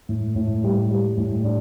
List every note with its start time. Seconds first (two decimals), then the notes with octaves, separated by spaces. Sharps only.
0.09 A2
0.36 A2
0.64 G3
0.91 G3
1.17 A2
1.44 D4